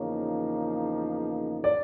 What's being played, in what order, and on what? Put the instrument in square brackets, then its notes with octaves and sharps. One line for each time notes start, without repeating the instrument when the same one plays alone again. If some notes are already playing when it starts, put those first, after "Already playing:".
Already playing: [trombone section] E2 C#3 F3 A#3 D#4 [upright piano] C#5
[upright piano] D5